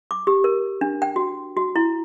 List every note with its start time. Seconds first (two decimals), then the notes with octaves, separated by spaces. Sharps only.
0.11 D6
0.27 G4
0.44 A#4
0.81 D4
1.02 G5
1.16 F#4
1.57 F#4
1.76 E4